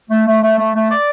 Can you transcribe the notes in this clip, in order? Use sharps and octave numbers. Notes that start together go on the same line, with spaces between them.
A3
A3
A3
A3
A3
D5